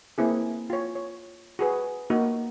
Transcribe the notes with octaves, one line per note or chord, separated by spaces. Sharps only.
A#3 C4 E4 G#4
F4 C#5
C#5
F#4 G#4 B4
A#3 D#4 F#4